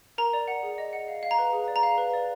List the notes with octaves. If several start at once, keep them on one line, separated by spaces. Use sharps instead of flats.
A#4 A#5
D5
F#5
G#4
D#5
F#5
F5
F5
A#5
B4
G#4
D5
A#5
F5
B4
D5